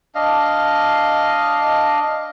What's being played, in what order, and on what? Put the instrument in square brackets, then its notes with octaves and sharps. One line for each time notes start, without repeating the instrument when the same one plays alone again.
[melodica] D4 D#5 F5